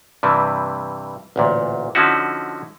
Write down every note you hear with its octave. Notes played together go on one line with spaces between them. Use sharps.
G2 C3 E3 G3
A1 D2 A#2
D3 F3 C#4 D#4 E4 F#4